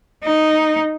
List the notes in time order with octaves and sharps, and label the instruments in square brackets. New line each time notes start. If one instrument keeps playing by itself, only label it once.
[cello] D#4